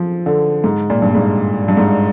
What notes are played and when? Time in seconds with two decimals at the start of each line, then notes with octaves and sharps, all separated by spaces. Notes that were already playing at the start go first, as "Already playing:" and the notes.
Already playing: F3
0.26 D3
0.64 G#2
0.90 A#2
1.02 G2
1.14 G#2
1.68 G2
1.77 G#2